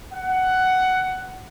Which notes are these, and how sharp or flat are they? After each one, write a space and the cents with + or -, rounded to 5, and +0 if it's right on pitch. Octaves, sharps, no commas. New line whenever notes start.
F#5 +10